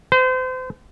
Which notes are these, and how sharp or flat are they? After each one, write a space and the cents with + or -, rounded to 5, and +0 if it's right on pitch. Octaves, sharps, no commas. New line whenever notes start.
C5 -35